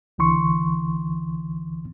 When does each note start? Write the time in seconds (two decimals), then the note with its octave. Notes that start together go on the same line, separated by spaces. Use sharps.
0.18 C#2 D3 E3 C6 C#6